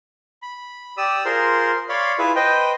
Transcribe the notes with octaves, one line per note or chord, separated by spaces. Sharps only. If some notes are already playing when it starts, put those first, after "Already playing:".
B5
G4 D5 D#6 E6
F4 G#4 A#4 C5 C6
C#5 D5 F5 B5 C6
E4 F4 G#4 B4 E5 F5
B4 C5 D#5 G5